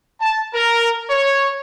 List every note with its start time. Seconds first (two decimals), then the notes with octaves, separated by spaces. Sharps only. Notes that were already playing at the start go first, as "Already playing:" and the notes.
0.21 A5
0.54 A#4
1.10 C#5